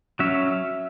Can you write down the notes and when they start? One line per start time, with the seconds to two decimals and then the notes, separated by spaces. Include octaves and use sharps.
0.19 F#3 C#4 E5